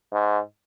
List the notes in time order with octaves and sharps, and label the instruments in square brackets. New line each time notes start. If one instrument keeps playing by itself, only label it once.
[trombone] G#2